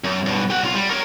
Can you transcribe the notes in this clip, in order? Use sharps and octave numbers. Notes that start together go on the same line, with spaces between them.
F#2
G2 B2
G4 F#5
B1 F4
G3
A#4 C#5